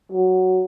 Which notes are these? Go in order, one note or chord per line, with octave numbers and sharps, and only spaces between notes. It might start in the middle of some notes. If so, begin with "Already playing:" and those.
F#3